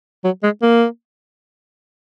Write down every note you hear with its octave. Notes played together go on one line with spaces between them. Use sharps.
F#3
G#3
A#3